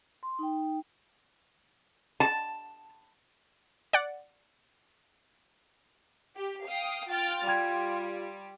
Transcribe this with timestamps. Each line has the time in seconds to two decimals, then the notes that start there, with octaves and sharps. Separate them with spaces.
0.23 C6
0.39 D#4 G5
2.20 A5
3.93 D5 F#5
6.36 G4
6.65 F5 G5 D#6
7.08 F4 G5 F6 A6
7.47 G3 G5 C6 G#6